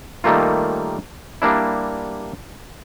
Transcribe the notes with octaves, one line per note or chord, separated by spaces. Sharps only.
D#3 G3 A3 A#3 F4
G3 A#3 D4 E4